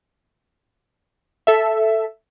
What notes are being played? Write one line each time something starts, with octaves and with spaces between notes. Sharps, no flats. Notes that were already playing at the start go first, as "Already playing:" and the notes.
A4 E5